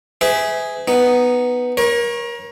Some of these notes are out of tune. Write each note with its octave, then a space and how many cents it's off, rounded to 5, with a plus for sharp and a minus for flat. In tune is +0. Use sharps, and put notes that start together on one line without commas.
G#4 +0 B4 +45 E5 -20
B3 +0 D#4 +0
A#4 +30 C#5 -25